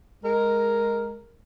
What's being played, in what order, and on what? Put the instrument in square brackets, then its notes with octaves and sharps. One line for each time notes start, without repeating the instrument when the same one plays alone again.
[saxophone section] G#3 A#4